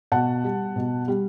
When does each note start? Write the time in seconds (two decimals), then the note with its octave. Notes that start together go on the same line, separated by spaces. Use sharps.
0.12 B2 F#5 A5
0.44 G3
0.76 B2
1.08 G3